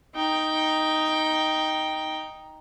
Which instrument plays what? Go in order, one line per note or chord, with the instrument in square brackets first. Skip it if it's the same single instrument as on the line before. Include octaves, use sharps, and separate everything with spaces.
[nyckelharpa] D#4 G5